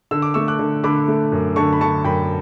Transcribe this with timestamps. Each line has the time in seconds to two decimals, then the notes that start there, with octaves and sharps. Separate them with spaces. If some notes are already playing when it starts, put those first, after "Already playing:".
0.11 D3 E6
0.22 D6
0.34 A3 C#6 E6
0.48 D6 F#6
0.59 D3
0.84 D3 B5 D6
1.08 A3
1.32 F#2
1.56 D3 A5 C#6
1.73 B5
1.81 D3 A5 C#6
2.04 F#2 G5 B5